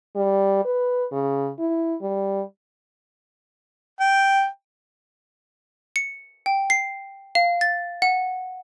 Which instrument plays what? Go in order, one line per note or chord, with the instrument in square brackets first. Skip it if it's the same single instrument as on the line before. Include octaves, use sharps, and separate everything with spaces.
[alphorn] G3
B4
C#3
E4
G3
[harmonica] G5
[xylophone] C#7
G5
C7
F5
A6
F#5